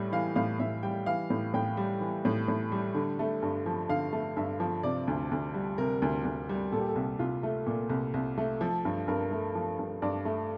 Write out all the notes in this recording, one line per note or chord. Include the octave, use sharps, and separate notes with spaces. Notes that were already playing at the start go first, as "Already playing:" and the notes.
Already playing: A2 G3
E3 F5
A2 F5
A2 E5
G3 G5
E3 F5
A2
A2 G5
G3
E3
A2
A2
G3
D3
A3
G2
F3
D3 F5
A3
G2 E5
F3
C3 D5
D2
D2
G3
C3 A#4
D2
D2
G3
A#2 A4
G4
A4
C2
C2 F4
A3
A#2
C2
C2
A3
F3 A4
G2
G2 A#4
A3
F3
G2
G2 D5
A3